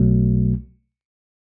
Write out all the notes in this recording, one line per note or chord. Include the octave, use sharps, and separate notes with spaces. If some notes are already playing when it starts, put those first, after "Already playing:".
Already playing: B1 B2 F#3 A3